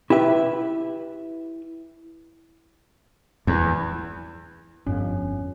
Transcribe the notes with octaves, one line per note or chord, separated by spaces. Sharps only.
E4 G4 B4 E5
E2
G1 F2 C#4